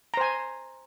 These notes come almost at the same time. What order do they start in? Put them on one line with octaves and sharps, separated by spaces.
A#5 C5 G#5